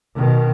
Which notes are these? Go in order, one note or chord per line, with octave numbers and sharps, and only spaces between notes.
B2 D#3